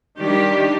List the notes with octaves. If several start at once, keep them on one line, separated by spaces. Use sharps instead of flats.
D#3 G3 D4 G4